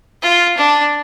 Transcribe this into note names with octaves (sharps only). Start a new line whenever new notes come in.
F4
D4